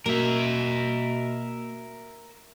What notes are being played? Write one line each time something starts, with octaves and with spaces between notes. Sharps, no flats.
B2 A#3 A#4 E5